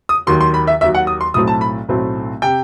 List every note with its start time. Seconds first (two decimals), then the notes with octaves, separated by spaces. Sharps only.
0.09 D#6
0.27 D#2 D#3 F#3 C6
0.41 C6
0.54 B5
0.67 E5
0.81 D#2 D#3 F#3 E5
0.95 F#5
1.07 D#6
1.21 C6
1.34 B1 A2 F#3 A3 C4 D#6
1.48 A5
1.61 B5
1.89 B1 A2 F#3 A3 C4
2.42 C3 G5